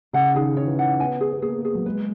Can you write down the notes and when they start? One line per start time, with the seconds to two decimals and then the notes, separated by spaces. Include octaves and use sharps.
0.13 C#3 F#5
0.35 D#3 G#4
0.56 D#3 C#5
0.67 E3
0.77 D#3 F#5
1.00 B3 G#5
1.21 G#4
1.33 B3
1.42 A#3 G#4
1.65 G#4
1.75 F#3
1.86 G#3 B4